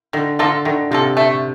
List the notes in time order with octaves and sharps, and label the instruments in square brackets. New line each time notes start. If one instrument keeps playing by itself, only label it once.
[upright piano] D3 [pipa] D#3
[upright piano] D3 [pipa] A#3 F4 A4
[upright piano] D3 [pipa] D#3
[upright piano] C3 [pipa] A#3 F4 A4
[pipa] A3